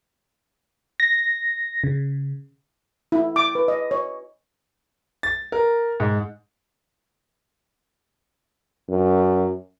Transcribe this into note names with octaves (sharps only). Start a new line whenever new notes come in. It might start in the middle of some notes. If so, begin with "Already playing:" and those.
A#6
C#3
E4
D6
B4
D#5
C#5
A6
A#4
G#2
F#2